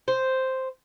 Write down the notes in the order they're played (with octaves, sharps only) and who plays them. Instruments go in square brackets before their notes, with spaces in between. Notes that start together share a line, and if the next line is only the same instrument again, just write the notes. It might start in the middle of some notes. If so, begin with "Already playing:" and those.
[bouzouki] C5